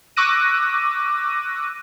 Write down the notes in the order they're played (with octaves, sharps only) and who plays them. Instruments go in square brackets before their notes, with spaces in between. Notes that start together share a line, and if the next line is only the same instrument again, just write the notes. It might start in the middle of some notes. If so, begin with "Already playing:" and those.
[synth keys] C#6 D6 E6 F#6 A#6 D#7